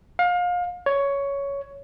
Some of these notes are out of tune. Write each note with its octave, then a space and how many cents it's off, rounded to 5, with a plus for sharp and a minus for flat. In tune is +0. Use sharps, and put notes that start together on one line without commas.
F5 +30
C#5 +10